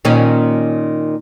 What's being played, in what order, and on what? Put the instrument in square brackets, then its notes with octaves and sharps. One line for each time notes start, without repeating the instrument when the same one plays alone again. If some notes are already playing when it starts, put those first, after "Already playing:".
[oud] A#2 D#3 C#4